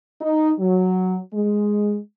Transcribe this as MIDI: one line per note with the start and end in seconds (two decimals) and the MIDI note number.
0.21 0.51 63
0.59 1.18 54
1.34 1.98 56